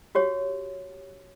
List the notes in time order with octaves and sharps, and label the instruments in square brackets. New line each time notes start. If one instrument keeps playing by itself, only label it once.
[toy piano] F#4 G4 C#5